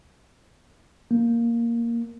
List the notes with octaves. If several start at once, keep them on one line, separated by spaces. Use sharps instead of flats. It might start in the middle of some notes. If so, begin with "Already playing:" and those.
A#3